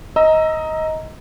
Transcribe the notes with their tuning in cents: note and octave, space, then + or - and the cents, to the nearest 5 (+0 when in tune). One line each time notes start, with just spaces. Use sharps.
D#5 +20 A#5 +0 E6 +5